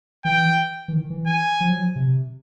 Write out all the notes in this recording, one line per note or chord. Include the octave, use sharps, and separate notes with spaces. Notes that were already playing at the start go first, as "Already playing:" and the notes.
E3 G5
E3
D#3
E3
G#5
F3
F#3
F3
C3